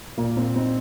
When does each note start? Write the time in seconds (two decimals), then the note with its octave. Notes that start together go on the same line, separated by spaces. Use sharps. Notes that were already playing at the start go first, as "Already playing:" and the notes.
0.17 A#2 A#3
0.37 C4
0.56 C4 D#4